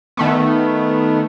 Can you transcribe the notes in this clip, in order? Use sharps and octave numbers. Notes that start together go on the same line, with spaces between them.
D#3 A3 B3